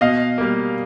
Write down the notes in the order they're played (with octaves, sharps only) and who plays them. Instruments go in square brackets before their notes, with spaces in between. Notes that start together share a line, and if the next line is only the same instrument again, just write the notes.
[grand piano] B2 D#5 F5
G3 A#3